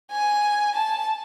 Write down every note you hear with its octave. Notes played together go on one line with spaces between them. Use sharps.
G#5
A5